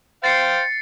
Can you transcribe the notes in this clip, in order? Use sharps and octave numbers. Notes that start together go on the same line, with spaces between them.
C5 F5 G5 A6 C7 C#7